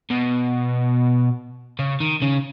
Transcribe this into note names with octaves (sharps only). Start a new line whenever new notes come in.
B2
C#3
D#3
C#3